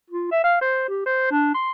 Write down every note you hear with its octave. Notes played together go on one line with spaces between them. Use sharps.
F4
E5
F5
C5
G4
C5
D4
C6